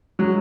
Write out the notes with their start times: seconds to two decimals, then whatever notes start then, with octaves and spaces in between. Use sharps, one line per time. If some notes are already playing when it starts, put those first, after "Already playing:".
0.19 F#3 G#3